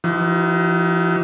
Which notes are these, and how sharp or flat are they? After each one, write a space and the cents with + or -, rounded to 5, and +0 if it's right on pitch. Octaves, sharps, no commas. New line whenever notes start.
F3 -40 D#4 +30 F#4 +45